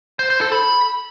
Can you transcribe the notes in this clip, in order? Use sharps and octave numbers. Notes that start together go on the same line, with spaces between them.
C5
C5
A4
B5